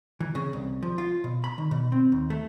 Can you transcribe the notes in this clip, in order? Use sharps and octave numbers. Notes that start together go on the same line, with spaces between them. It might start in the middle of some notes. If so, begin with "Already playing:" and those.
E3
C#3
C2
F3
F4
B2
B5
D#3
B2
C4
D#2
A3